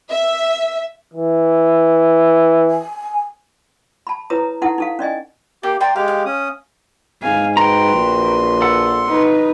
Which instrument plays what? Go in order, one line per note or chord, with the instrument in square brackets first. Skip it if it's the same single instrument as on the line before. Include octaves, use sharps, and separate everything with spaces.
[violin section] E5
[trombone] E3
[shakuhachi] G#5
[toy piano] A5 B5
E4 B4 C#5 A#5 D#6
D#4 E4 A4 F#5
D#4 A4 F5
C#4 D5 D#5 G#5
[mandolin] A#3 [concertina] G4
[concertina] D5 [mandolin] G5 A#5 C6
[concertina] G#3 G4 [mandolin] F5
[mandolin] F5
[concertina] C#4 D#6
[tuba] G#2 [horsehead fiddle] F5 G#5
[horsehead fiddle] F#4 B4 [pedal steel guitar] G5 A#5 [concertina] C6
[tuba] A#1
[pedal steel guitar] A4 F#5
[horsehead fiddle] D#4 B4